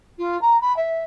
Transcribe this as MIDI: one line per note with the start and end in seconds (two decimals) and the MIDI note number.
0.18 0.40 65
0.41 0.60 82
0.61 0.76 83
0.77 1.03 76